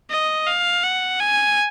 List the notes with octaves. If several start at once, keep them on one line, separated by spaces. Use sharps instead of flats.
D#5
F5
F#5
G#5